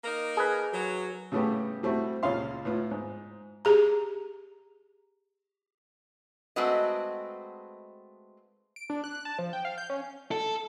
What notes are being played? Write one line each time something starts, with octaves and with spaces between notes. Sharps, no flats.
A#3 D#4 A#4
G#4 B4
F#3
A2 C#3 G3 A3 B3 G4
G3 A3 C4 E4 F#4
C#2 A#2 C#4 F5 C6
A2 B3 F4
G#2
G4 G#4 A#5
G#3 A3 C4 F#4 B4 D#5
D7
D4
F#6
A5
F3
G5
F5
G6
C#4
A4